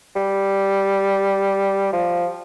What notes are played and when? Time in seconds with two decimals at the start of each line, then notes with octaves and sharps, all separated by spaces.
0.16 G3
1.93 F3